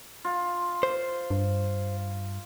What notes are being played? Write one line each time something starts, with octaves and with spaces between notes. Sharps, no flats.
F4
C5
G2